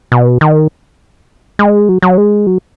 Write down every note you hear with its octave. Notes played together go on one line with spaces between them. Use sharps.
B2
D#3
G#3
F#3
F#3
G#3
F#3